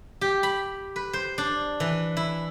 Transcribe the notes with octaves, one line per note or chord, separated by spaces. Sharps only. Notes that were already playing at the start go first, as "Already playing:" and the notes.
G4
B5
B4
C5
D4
E3
E4